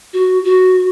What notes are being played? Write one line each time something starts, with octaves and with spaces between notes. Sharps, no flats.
F#4
F#4